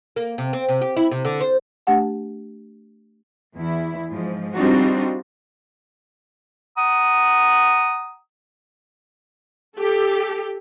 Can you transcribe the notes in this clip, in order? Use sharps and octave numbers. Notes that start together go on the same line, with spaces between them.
A#3
C3
C4
C3
G4
E4
C3
D3
C5
A3 D4 G4 F#5 A5
E2 E4
G#2 F3
G3 C4 D4 D#4 F4 F#4
F#5 A#5 D#6
G4 A4